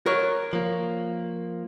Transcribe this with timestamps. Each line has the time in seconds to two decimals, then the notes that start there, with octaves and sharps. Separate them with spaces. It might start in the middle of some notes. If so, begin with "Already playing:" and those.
0.06 A#4 C#5
0.53 F3 A#3